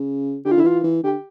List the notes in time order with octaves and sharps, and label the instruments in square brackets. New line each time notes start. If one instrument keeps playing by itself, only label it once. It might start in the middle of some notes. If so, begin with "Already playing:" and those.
Already playing: [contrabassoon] C#3
[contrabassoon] D3 [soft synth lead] G4
[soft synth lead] F4
[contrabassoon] D3
[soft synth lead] E4
[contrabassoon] E3 [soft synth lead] F4
[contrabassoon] E3
[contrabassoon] D3 [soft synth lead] G4